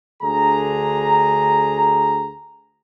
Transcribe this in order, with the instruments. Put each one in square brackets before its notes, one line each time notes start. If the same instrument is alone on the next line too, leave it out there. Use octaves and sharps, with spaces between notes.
[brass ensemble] D2 D3 G#4 A#5